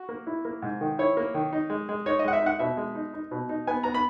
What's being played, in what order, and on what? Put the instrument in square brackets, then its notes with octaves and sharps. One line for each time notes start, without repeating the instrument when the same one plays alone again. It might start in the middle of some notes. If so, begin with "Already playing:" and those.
Already playing: [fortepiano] F#4
A#3
E4
A#3
G#2
D#3
E4 C#5
A#3
D#3
D#4
G#3
G#3
D#4 C#5
D#5
G#3 F#5
E5
D#4 F#5
B2 E5
G#3
D#4
D#4
B2
D#4
B3 G#5
B3 A#5
B5